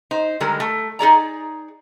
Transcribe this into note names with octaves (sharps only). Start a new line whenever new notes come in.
D#4 C5
D3 D#3 G3 G#3 A#4
A3
D#4 G#4 D5 A#5